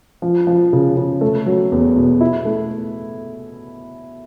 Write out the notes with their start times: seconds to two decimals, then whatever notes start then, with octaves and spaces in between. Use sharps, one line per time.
0.22 F3
0.47 F3
0.73 C#3
0.97 C#3
1.21 A3
1.46 F#3
1.72 E2
1.97 B2
2.21 E4
2.45 A3